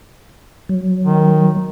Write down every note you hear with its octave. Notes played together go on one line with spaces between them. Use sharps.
F#3
D#3